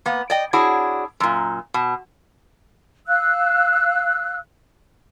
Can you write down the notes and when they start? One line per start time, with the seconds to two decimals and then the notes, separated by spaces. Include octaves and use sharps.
0.06 A#3 B3
0.30 D5 D#5 G5
0.53 D4 E4 F#4 G#4 C#5
1.20 F#2 A#2
1.74 B2
3.07 F5 E6 F#6